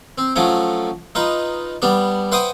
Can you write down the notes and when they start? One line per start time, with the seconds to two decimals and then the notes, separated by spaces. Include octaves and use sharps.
0.18 C4
0.36 F3 F#3 A3 C#4
1.15 D#4 F4 B4
1.82 G3 B3 D4
2.32 B4 C5 E5 F#5 G5 D#6